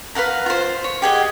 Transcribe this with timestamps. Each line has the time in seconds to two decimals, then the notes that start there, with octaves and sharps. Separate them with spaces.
0.15 B4 F5 F#5 A#5
0.46 F4 C5
0.84 C#5
1.02 G4 G#4 D#5 F#5